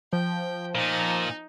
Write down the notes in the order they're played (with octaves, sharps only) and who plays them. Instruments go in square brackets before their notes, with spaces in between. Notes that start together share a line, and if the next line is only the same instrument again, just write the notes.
[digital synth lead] F3 [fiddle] G5
[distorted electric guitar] A#2 [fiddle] D#4